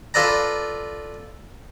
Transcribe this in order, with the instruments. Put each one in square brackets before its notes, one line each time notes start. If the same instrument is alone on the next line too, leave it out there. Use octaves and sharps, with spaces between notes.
[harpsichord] F4 A4 B4 D5 A#5